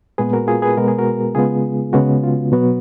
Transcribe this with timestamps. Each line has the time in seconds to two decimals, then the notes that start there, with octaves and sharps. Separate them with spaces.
0.18 A#2 G#3 B3 G#4 B4
0.33 F#4 A#4
0.48 F4 G#4
0.62 G#4 B4
0.77 B2 G#3 B3 A#4
0.88 G#4
0.98 F#4 A#4
1.35 C#3 G#3 B3 F4 G#4
1.93 C#3 G#3 B3 F#4
2.23 F4
2.52 B2 F#3 B3 F#4